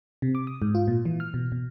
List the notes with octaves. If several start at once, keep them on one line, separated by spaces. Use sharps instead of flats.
C3
D6
D#6
G#2
F4
A#2
E3
F6
B2
B2